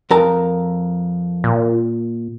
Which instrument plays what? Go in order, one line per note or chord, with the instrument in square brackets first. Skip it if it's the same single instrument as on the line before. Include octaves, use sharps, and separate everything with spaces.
[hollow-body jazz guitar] F2 A#4 A5
[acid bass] A#2